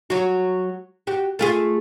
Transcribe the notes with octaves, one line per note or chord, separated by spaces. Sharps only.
F#3 F#4
F#4 G4
A3 F4 G#4